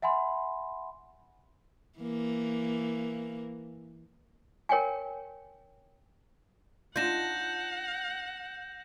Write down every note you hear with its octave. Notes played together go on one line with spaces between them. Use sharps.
E5 F#5 G#5 B5 C6
E3 A#3
A#4 C#5 G5 G#5
D4 D#4 F4 F#5 G6 A#6 E7